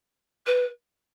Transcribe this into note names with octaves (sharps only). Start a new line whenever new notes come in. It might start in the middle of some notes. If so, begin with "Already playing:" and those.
B4